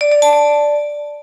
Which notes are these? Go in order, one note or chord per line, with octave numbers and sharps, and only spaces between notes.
D5
D5
A5
D5